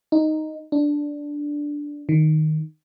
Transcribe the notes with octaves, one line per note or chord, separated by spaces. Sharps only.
D#4
D4
D#3